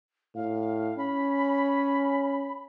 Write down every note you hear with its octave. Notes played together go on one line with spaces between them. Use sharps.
A2 F5
C#4 B5